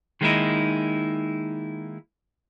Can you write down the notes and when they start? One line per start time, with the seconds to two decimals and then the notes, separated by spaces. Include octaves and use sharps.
0.21 D#3 G#3 A#3 C#4 D#4 E4